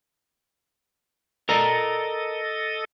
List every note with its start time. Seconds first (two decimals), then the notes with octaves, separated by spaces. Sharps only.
1.49 A4 A#4 D5 D#5 A#5